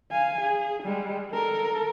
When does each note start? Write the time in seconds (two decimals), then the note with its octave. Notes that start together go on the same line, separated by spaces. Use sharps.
0.11 F5 G#5
0.41 G#4
0.83 G3 G#3
1.31 A4 A#4